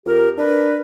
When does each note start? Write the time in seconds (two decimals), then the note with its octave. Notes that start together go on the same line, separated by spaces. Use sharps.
0.06 F2 G4 A#4
0.38 D4 A#4 B4